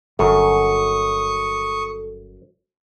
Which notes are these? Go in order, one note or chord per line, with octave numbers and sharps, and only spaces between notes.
G1 F#2 A4 C#6 D#6